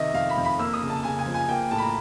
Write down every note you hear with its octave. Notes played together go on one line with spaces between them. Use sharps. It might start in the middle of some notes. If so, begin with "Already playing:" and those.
Already playing: C3 D#3 D#5 E5
F2 F5
B5
F2
B5
A#3 E6
D#6
C#3
A5
C#3 G#5
G#5
F3
G#5
A#3 G5
A2 A5
B5
A#5